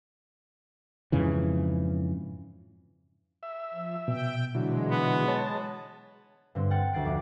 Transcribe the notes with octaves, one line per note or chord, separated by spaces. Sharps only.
F2 G#2 C#3 E3
E5
F3
B2 G5
D3 E3 F#3 G#3
B3
C#5 A5
G2 D3 C4
F#5 G5 F6 A6 C#7
D2 F#5 A6 C7 D7
F1 D4 D6